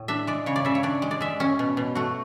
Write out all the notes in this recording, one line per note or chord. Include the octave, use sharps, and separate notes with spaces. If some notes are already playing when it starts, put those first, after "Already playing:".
Already playing: A2
D4 E5
G#3 D5
C#3 C#5
D5
C#3 E5
C#5
D4 D5
G#3
D5
G#3 E5
C#4
B2
B2
A3 F#4